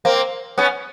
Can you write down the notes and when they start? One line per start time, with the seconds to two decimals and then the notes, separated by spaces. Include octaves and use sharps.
0.05 A#3 C4
0.58 B3 C#4